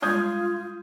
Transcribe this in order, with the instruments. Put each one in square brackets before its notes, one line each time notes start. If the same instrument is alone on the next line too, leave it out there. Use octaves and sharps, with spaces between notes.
[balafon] G3 G#3 D4 [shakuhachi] F4 [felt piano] D#6 G6 G#6